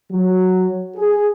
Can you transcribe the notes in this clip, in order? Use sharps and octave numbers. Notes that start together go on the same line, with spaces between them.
F#3
G#4